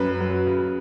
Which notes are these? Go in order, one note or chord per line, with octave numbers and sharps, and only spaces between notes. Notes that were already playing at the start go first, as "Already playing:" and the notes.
Already playing: F#2 B4
F#3
C#3